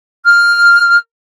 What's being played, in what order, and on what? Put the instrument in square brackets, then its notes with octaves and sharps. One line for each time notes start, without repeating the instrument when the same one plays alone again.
[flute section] F6